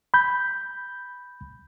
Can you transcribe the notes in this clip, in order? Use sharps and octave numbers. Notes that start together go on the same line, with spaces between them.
B5 G6